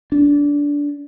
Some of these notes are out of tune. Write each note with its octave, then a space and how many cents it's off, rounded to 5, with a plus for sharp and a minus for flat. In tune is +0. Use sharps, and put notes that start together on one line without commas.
D4 -20